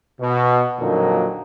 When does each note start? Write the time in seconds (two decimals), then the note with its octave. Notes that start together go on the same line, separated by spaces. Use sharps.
0.21 B2
0.80 F2 A#2 D3 F#3 A#3 D#4